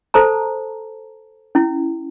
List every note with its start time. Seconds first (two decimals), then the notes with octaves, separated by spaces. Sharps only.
0.14 A4 C5 A5 A#5
1.55 C#4 E4